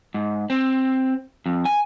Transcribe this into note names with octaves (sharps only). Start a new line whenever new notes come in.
G#2
C4
F2
G#5